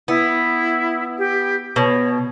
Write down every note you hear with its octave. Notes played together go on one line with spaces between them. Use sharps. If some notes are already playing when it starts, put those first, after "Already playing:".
B3 E4
G4
B2 C#5